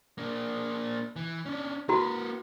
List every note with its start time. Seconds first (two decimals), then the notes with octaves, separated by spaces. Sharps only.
0.18 A#3 D4
1.16 E3
1.46 C#4 D4
1.89 A#3 E4 F#4 B4 C6